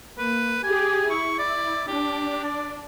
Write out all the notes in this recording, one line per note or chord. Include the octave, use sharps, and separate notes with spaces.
A#3 B4
G4 G#4 G#5
E4 C#6
D5
D4 G4
D5